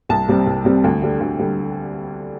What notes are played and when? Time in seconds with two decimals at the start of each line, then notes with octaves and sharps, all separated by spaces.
0.09 C2 A5
0.29 C3 G3 C4
0.47 C2
0.65 C3 G3 C4
0.84 D2 G5
1.02 D3 G3
1.21 D2
1.39 D3 G3